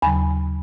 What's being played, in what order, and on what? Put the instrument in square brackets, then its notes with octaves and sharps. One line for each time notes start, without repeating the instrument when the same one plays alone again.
[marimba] D#2 C#3 F#3 G#5 B5